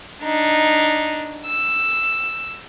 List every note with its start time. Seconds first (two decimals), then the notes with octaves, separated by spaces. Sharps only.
0.24 D4 D#4
1.47 E6